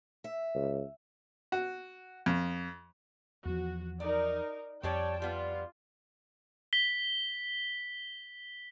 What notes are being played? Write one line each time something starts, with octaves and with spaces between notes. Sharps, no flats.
E5
C#2
F#4
F2
E2 F3 F#4
D#4 A#4 D5
F2 F3 G3 C#5 D5 G5 A5
G3 B3 F4
B6 G7